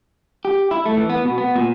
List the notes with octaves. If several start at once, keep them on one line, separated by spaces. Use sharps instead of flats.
G4
E4
A3
E3
B3
B2
B3
A#2